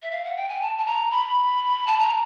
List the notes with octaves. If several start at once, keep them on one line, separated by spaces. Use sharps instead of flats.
E5
F5
F#5
G5
G#5
A5
A5
A#5
B5
A5
A#5